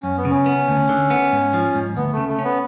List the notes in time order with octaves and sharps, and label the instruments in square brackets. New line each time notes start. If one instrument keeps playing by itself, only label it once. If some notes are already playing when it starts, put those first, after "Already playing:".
[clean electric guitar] F#2 [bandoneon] C#4
[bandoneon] B3
[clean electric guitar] C#3
[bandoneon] C#4
[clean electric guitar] B3
D2
D3
B3
G#2
F3
G#2
[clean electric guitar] D2 [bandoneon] B3
[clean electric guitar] C#3 [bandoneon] A3
[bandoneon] A3
[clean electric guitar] C#4
[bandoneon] B3